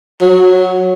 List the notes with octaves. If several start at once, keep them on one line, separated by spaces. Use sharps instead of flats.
F#3